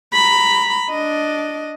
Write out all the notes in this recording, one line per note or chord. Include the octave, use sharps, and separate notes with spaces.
A#5 B5
D4 D#5